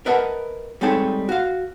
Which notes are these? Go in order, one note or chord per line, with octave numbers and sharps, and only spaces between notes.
A#4 B4 D#5 E5 F#5 A5
G3 G#3 C4 D#4 A4 C#5
F#4 F5